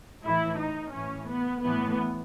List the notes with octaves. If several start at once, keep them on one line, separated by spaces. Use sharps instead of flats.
A2 E3 E4
D#4
A2 E3 C#4
B3
A2 E3 B3